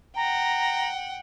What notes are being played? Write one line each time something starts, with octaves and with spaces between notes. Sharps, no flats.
F#5 G5 A#5